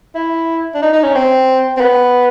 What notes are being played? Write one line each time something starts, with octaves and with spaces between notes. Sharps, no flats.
E4
D4
D#4
D#4
C#4
C4
C4
B3